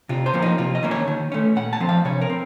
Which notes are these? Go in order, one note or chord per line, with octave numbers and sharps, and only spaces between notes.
C3 F4
C5
F3 A#3 C#4
D#4
C3 F4
D#5
D#3 A#3 C#4
C#5
D#3
A3 C#4
A#2 F#5
A5
F3 C4
F5
C3 C#5
A#4
C4